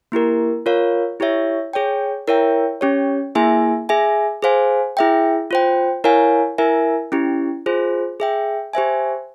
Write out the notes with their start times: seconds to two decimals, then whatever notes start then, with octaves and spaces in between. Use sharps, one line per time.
0.12 A#3 E4 G4 A#4
0.66 F4 A#4 C#5 F5
1.20 E4 G4 C#5 E5
1.73 G#4 C#5 G5
2.28 E4 A#4 C#5 E5 G5
2.81 C#4 G4 C#5
3.35 A#3 E4 G#4 E5 G#5
3.89 G#4 E5 G#5
4.42 G#4 C5 F5 G#5
4.97 E4 G#4 E5 G5
5.51 F4 C5 G5
6.04 E4 A#4 C#5 F5 G#5
6.58 E4 A#4 E5 G#5
7.12 C#4 E4 G4
7.66 F4 G#4 C5
8.20 G#4 E5 G5
8.73 G4 C5 E5 G#5